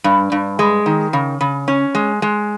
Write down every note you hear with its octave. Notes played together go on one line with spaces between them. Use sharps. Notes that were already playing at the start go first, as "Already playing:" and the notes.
G2
G2
G#3
D#3
C#3
C#3
C#4
G#3
G#3